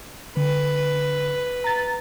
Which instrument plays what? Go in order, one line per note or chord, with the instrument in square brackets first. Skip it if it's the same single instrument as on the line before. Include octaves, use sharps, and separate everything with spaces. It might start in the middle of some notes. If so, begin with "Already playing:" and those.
[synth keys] D3 [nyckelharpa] B4
[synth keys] A#5 A6